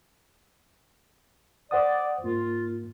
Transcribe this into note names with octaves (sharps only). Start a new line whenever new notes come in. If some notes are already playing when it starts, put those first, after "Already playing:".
C5 D5 F#5 D#6
G#2 A#3 F4